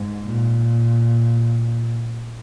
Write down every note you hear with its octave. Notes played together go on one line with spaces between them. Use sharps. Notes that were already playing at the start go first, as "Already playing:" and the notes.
Already playing: G#2
A#2